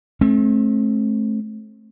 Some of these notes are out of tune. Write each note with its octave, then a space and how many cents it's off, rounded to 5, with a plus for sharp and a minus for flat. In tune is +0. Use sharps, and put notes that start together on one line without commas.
A3 -25 C4 +40